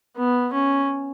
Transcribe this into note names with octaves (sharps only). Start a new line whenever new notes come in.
B3
C#4